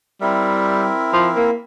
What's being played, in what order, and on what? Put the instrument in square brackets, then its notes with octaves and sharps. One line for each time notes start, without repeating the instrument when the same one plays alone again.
[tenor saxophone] G3 [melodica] C4 E4 A#4 E5
[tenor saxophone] F3
A#3